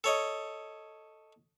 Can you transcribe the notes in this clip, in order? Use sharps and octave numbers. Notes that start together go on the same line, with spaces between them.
A4 C#5 D#5